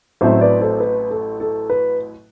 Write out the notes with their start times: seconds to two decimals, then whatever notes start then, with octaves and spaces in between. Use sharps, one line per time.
0.21 A1 A2 F#3 A3 C4 C5 E5
0.41 B4 D5
0.61 A4 C5
0.80 B4
1.10 A4
1.40 A4
1.70 B4